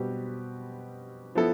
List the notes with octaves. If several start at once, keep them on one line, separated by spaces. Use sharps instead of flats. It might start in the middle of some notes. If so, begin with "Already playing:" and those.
Already playing: B2 G3 C4 G4 B4
F3 B3 E4 A4